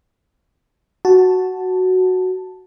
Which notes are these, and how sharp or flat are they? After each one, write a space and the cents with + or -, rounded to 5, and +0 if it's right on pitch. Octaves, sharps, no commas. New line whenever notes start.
F#4 +0 A5 +0